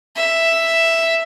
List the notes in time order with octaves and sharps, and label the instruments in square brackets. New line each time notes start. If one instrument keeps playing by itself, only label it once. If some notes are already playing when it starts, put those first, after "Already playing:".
[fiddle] E5